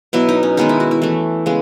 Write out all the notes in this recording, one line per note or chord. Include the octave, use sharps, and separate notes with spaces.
B2 F#3 B3 E4
D#4
C#4
D#3 G#3 B3 D#4
E4
F#4
E4
E3 A3
C#3 G#3 B3